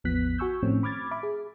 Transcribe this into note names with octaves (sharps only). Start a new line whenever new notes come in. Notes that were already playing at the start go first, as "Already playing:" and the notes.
A1 E2 F3 B3 F#6 B6
F#4 G#5 C#6 E6 G6
A2 D#3 F3 A3 C4 C#4
B5 D6 F6 G#6 A6
E5 B5 D6
G#4